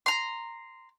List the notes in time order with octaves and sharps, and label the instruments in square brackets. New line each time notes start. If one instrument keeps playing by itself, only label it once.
[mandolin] A#5 C6